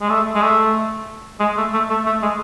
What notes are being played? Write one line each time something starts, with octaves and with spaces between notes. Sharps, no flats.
G#3
A3
G#3
A3
G#3
A3
A3
A3
A3
G#3